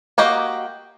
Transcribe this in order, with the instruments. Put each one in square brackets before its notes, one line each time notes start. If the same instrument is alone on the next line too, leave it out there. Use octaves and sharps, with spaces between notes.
[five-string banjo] A#3 F#4 G4 D#5